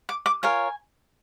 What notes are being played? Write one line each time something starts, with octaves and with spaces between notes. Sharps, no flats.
D6
D6
F4 A#4 C#5 G#5